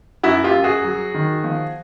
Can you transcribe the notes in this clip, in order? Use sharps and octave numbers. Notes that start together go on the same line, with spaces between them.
F#2 E4 F#4
F4 G4
F#2
F#4 G#4
F#3
D#3
F3